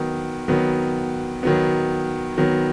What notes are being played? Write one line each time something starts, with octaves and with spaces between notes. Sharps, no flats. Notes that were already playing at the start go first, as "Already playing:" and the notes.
Already playing: D#3 F#3 B3
D#3 F#3 B3
D#3 F#3 B3
D#3 F#3 B3